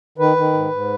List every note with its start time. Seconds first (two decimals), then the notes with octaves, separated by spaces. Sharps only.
0.18 D#3 B4
0.36 D#3
0.53 G#2
0.71 G#2